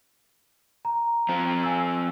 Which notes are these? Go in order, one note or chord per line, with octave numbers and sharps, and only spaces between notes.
A#5
F3 C4
G#5 E6